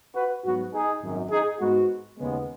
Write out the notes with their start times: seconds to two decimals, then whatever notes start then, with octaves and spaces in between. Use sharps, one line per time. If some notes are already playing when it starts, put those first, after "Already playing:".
0.14 F#4 B4
0.44 G#2 F#3 B3 F#4
0.73 D#4 G#4
1.02 G#1 F#2 D#3
1.30 D#4 G#4
1.59 G#2 G#3 B3 F#4
2.18 D#2 C#3 G#3 B3